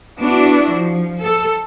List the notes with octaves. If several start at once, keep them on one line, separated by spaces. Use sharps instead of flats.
B3 D4 E4 F#4
F3
A4